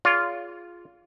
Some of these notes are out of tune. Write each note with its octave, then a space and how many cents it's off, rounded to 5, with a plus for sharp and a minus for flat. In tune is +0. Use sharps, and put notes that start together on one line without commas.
F4 +0 G#4 +0 D5 -45